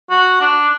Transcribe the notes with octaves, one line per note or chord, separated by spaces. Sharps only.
F#4
D4